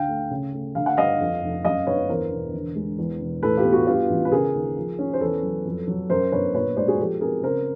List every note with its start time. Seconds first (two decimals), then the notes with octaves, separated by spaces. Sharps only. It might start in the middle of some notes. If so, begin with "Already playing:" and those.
Already playing: D2 D3 F5 G5
0.08 A3
0.31 C#3
0.53 A3
0.75 D3 F5
0.86 F#5
0.97 G2 D#5 F5
1.20 F2
1.42 F1
1.64 F#2 D#5 F5
1.86 G1 B4 C#5
2.09 E2 A#4 C5
2.31 E1
2.54 D3
2.76 G#3
2.98 E2
3.20 E1
3.43 A2 A4 B4
3.57 F4 G4
3.65 B3
3.73 F#4
3.87 G2 F4 G4
4.09 A1
4.25 B4
4.32 C#3 G#4 A#4
4.54 D#2
4.76 F3
4.99 C#4
5.13 C5
5.21 E2 A4 B4
5.43 F#3
5.65 F2
5.88 F#3
6.10 F#2 A#4 C5
6.32 G1 B4 C#5
6.54 A#2 B4 C#5
6.77 G#3 C5 D5
6.88 F#4 G#4
6.99 F3 G4 A4
7.21 C4 G#4 A#4
7.43 C#3 A#4 C5